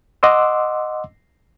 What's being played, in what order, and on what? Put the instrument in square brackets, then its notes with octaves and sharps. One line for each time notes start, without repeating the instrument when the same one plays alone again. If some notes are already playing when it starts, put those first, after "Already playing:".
[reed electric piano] D#5 F#5 C6 D6 E6